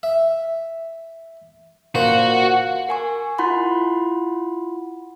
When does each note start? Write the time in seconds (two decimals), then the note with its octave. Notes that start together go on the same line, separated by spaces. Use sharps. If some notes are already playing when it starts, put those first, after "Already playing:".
0.03 E5
1.95 A#2 F#4 C5
2.89 A#4 G#5 C#6
3.38 E4 F4 F#5 B5 C6